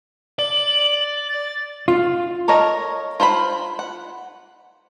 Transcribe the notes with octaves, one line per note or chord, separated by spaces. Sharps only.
D5 F#7
A6
F4
A4 A#4 C#5 D#5
F4 C5 A5 B5
F#5